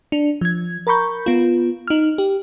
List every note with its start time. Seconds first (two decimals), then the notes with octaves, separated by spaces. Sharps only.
0.12 D4
0.41 F3 G#6
0.87 A#4 A#5 B5 C#6 G6
1.26 B3 F4
1.87 D#4 F6
2.18 G4